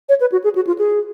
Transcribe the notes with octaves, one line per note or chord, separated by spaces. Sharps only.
C#5
B4
F#4
G#4
F#4
F4
G#4